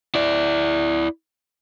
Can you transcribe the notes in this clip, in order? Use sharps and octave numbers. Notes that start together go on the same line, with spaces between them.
E4 D5